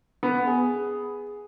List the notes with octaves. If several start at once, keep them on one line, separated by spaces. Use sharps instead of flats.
B3
G#4